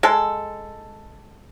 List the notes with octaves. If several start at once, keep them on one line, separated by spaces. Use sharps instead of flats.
G#3 A4